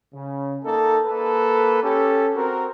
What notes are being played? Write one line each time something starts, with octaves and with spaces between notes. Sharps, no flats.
C#3
A#3 D#4 A4
A#3 A4 B4
C#4 G4 A4
C4 F#4 A#4